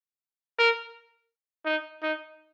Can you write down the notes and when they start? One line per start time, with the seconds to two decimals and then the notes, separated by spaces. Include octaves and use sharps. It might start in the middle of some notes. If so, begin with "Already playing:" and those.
0.59 A#4
1.65 D#4
2.02 D#4